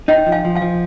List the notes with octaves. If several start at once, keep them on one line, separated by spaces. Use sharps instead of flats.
D#4 D#5 G5
F3
F5 G#5
F3
F5 G#5
F3